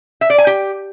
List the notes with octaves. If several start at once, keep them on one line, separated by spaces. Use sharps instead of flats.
E5
D5
G#5
G4